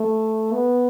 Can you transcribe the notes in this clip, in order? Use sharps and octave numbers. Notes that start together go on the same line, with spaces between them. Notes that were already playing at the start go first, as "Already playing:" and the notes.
Already playing: A3
B3